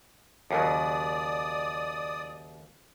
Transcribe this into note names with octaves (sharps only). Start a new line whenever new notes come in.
D#2 C#3 F#3 D5 D#6